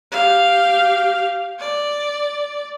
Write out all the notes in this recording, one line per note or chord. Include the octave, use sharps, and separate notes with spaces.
G4 F5
D5